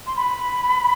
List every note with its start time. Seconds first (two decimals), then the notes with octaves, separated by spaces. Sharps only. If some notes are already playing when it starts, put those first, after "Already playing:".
0.07 C6
0.16 B5